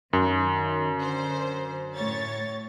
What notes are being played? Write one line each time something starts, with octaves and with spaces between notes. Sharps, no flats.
F#2 D#3
D3 C5
A2 C#5 A6